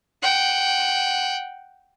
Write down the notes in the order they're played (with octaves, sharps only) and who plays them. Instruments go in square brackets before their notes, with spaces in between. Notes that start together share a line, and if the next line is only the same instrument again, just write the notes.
[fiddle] F#5 G5